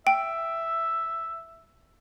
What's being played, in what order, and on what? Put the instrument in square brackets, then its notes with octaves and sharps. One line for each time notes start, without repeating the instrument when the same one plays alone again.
[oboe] E5 [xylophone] G5